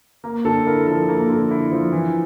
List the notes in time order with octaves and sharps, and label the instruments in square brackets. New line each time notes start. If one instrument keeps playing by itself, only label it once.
[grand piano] A#3
[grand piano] D3 [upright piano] A4
[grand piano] E4 [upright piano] A#4
[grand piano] F3 [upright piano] A4
[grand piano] A#3
D3
E4
F3
E3